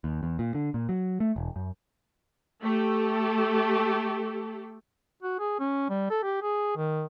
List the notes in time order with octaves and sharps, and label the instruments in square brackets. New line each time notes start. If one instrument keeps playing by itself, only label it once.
[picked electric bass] D#2
E2
A#2
D3
A#2
F#3
A3
E1
F#2
[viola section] A3 G4 A4
[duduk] F#4
G#4
C#4
G3
A4
G4
G#4
D#3